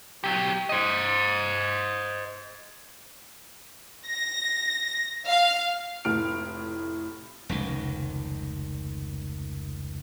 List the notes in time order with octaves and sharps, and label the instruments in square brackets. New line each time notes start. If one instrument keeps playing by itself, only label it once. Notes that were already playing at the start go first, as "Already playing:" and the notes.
[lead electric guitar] F#3 G4
C5 D#5
[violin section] A#6
F5
[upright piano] F1 A2 F6 D7
[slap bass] F1 C#2 D#3